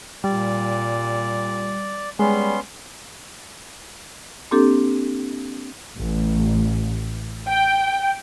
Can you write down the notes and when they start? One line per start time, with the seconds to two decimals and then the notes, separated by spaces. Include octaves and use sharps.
0.24 A#2 G3 D5
2.19 G3 G#3 B3 C#4 C6
4.51 A#3 C4 D4 G4 A4
5.97 A1
7.49 G5